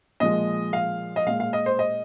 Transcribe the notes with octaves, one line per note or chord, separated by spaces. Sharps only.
A#2 F3 G#3 D#5
F5
D#5
A#2 G#3 F5
F5
D#5
C5
D#5